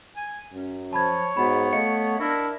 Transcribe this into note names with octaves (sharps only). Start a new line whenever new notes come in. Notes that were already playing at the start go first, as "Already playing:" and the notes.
G#5
F#2 C#4
F3 C#5 A5 B5 G#6
G#2 B3 F#4 B5
A3 D#5 F5 C#7
D4 E4 A#4